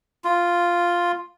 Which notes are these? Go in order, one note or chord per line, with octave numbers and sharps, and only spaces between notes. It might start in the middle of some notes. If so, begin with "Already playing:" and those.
F4